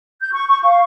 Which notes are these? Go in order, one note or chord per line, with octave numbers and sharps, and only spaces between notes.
G6
C#6
C#6
F5